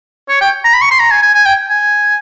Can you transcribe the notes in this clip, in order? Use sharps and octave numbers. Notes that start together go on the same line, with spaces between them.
C#5
G5
A#5
B5
C#6
C6
A#5
G#5
G#5
G#5
G5
G#5